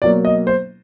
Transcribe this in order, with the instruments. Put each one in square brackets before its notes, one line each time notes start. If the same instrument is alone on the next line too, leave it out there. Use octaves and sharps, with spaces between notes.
[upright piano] B2 F#3 A#3 [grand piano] D5
[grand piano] D#5
C5